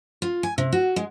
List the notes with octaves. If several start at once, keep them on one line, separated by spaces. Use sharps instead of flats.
F4
G#5
C3
F#4
G#3